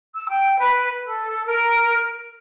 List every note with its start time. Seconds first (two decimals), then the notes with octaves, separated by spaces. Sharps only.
0.15 E6
0.31 G5
0.60 B4
1.04 A4
1.46 A#4